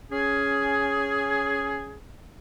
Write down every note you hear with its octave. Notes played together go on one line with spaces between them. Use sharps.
C#4 G#4